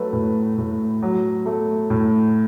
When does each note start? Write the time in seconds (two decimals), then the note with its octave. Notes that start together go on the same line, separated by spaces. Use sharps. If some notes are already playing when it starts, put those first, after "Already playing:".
Already playing: F#3 A3 B4
0.13 A2
0.58 A2
1.02 F#3
1.46 A3
1.90 A2